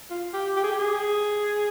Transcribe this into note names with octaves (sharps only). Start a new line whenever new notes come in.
F4
G4
G4
G#4
G4
G#4